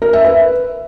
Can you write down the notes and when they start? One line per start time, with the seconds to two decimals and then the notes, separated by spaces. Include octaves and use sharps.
0.02 A#4
0.13 E5
0.25 B4